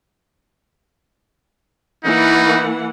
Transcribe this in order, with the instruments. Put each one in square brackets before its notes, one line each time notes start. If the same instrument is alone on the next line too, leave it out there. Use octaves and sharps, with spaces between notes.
[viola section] E3 A#3 F#5 [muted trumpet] D#4